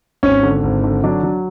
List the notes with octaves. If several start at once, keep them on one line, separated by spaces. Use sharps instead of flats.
G#1 C#4
D3
G#1
D3
F#3 D4
F#3